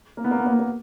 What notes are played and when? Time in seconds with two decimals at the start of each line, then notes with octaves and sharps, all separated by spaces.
0.17 A#3
0.24 B3
0.31 A#3
0.39 B3
0.46 A#3
0.54 B3
0.60 A#3